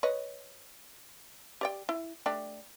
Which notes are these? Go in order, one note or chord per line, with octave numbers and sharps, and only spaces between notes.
B4 C#5 D#5
G4 D5 G5
E4
A3 D4 G4